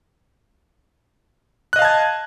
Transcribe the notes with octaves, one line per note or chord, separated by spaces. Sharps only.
D#5 F5 A5 F#6 G#6